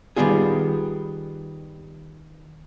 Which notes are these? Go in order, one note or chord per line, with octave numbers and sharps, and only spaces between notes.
D#3 F#3 G3 B3 F4 G#4